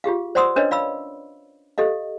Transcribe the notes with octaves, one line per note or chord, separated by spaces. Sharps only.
F4 G4 G#4 F5
C5 D5 F#5 C6 D#6 E6
C#4 D4 A#4 B4 C#5 D#5
D5 F5 B5 E6
G4 A4 D#5 F5